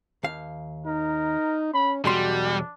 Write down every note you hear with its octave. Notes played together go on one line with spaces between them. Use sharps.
D#2 F5
D#4 A#4
C#4 B5
B1 E2 G3 D4 F#4 C6